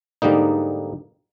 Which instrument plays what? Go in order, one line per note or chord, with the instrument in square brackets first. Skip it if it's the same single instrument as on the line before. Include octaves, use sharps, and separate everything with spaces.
[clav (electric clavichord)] G#2 D3 G3 A#3 D#4